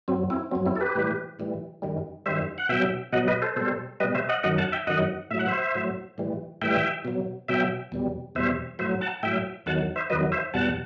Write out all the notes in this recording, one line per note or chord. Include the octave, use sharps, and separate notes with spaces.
F#2 F#3 C4
C4 E4
F#2 F#3 C4
C4 E4
A4
G4 B4
A2 E3 G3
A2 E3 G3
F#2 D#3 G3
F#2 D#3 G3 C5 E5
F#5
B2 F#3 E5 G5
B2 F#3 D#5 F#5
B4 D#5
A4 C5
B2 G3 A4 C5
B2 G3 B4 D#5
C5 E5
D#5 F#5
F#2 D#3 F#3 D#5 F#5
F#5 A5
E5 G5
F#2 D#3 F#3 D#5 F#5
A2 F#3 E5
F#5
C5 E5
A2 F#3
A2 E3 G3
A2 E3 G3 E5 G5
B2 F#3
B2 F#3 E5 G5
E2 B2 G3
E2 B2 G3 C5 E5
A2 F#3 C5 E5
F#5 A5
A2 F#3 E5 G5
E2 D#3 F#3 F#5 A5
C5 E5
E2 D#3 F#3 B4 D#5
C5 E5
E2 B2 G3 F#5 A5